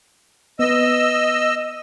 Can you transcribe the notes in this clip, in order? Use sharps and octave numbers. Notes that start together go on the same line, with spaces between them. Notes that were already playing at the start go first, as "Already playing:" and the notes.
B3 B4 D#5 E6